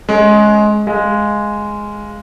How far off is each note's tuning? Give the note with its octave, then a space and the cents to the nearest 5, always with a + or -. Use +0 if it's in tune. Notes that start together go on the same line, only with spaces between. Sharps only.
G#3 +20 C#4 +0
G#3 +0 F5 -10